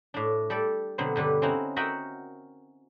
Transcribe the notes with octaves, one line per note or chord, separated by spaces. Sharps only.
A2 D4
G3 A4 D5
B2 D3 F#3 B3 C4
G2 D3 G3 B4
C4 C#4 D#4 E4 F#4
F#4 A#4 D#5 E5 F#5 G5